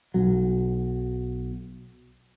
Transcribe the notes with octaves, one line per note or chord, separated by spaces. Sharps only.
B1 F#3